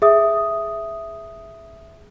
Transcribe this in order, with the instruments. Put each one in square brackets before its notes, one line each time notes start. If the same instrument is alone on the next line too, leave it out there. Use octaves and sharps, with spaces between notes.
[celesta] G#4 E5 D#6